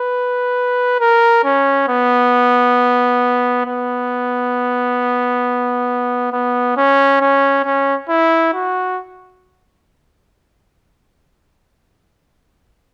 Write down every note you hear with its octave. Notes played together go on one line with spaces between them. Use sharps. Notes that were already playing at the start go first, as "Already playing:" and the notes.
Already playing: B4
A#4
C#4
B3
B3
B3
C#4
C#4
C#4
E4
F#4